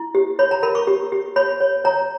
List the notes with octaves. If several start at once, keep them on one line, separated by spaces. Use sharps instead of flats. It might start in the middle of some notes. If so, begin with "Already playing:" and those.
Already playing: E4
G4
C#5 B5
A#5
A#4 B5
C#6
G4
G4
C#5 B5
C#5
C#5 A#5